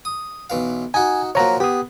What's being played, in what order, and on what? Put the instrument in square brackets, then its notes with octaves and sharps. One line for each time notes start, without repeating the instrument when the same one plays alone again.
[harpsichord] D#6
B1 E3 F5
[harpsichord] D#4 F#4 [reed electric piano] G#5
[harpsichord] F3 F#3 A#3 [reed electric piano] C#5 A#5
[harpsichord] B3 [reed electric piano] G4 D#6